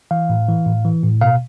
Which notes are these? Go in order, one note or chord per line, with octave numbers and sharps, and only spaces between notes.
E3 F5
A2
E3
A2
E3
A2
B2 F5